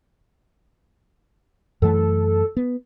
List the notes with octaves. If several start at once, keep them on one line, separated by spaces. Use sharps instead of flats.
F#2 E3 A3 A4
B3